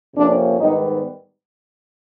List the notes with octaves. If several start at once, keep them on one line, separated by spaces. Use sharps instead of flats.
F2 C3 F3 A#3 C#4 D4
G#2 D#3 G3 B3 D#4